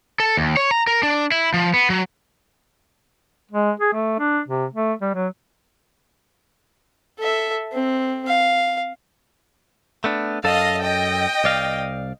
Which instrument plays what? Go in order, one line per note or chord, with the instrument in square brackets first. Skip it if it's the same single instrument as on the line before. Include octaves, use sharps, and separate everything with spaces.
[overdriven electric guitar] A4
D#2
C#5
A#5
A#4
D4
E4
F3
B3
F#3
[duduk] G#3
G#4
A3
D4
C3
A3
G3
F#3
[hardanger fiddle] A4 E5
C4
F5
[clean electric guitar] A3 B3 D4
[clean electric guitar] F#2 A4 A5 [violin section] D#5 F5
[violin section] D#5 G5
[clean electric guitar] C2 D5 F5